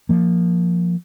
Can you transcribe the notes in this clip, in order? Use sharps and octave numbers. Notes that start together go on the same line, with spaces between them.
F3 A#3